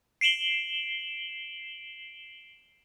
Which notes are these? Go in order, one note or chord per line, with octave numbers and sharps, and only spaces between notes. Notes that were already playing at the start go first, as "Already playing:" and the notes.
C7 D7 E7 F#7 G7